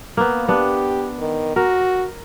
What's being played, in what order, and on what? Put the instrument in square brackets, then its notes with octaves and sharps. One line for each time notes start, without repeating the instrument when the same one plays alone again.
[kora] A#3 B3
[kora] B3 D4 [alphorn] G4
[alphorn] D#3
[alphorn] F#4 [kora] A#4